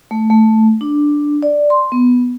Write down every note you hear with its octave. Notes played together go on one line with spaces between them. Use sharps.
A3
A3
D4
D5
C6
B3